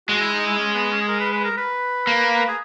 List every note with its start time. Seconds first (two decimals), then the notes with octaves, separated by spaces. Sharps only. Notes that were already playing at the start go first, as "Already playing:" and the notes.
0.09 G#3 F#4
0.20 E4
0.33 D#4
0.46 E4
0.58 C#4
0.75 B3
0.91 C#4
1.01 G#4
1.08 A#4
1.20 B4
1.33 B4
1.45 A#4
1.57 B4
2.07 A#3
2.48 G#4